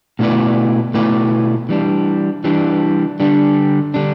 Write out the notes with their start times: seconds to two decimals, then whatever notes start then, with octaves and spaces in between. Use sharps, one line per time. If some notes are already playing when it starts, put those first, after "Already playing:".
0.19 B2 A3 E4 B4 D5
0.94 B2 A3 E4 B4 D5
1.69 E3 G3 D4
2.44 E3 G3 D4
3.20 D3 G3 D4
3.94 D3 G3 D4